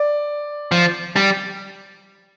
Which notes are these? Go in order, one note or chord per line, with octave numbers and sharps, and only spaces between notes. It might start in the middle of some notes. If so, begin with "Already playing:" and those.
Already playing: D5
F3
G3